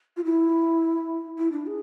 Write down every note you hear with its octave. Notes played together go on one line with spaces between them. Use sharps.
F4
E4
E4
D4
G#4